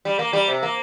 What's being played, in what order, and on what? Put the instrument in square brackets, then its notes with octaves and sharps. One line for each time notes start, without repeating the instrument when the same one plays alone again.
[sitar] G3
A#3
G3
C3
A#3